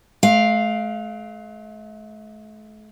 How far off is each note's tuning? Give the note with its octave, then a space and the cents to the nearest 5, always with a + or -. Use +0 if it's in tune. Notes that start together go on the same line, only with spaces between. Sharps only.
A3 -45 F5 +0